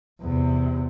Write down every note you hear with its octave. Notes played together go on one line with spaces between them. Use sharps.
E2 C3